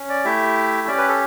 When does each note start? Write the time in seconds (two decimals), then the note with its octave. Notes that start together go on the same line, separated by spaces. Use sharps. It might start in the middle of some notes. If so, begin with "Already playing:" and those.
Already playing: C#4
0.09 D5
0.25 A3 E4 G4 E5
0.87 C#4 G4 D5
0.98 B4
1.08 A4